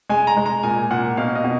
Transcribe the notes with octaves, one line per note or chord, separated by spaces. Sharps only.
G#3 G#5
A#5
G#3
A#5
A#2 G#5
A#2 F#5
B2 F5
D#5
B2